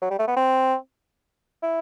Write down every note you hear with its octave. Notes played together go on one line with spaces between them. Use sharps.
F#3
G3
A3
B3
C4
E4